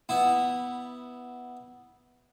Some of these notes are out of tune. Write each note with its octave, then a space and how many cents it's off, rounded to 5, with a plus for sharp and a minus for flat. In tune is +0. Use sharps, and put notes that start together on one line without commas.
B3 +0 E4 -15